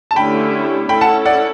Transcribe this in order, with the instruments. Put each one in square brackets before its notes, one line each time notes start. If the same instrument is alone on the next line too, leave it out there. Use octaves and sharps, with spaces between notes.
[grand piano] A5
[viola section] D3 A3 C#4 E4 G4 [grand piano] G5 B5
[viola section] C#4 E4 A4 [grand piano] G5 B5
[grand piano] F#5 A5
D5 F#5